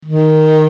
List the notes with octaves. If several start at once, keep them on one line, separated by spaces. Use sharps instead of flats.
D#3